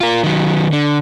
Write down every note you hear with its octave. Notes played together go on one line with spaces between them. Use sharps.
F4 A#4
D#3 F#3
D3